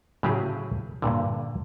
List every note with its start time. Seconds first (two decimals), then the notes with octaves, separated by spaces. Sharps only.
0.23 A2 C#3 F#3 G4 G#4
1.02 G2 A#2 D3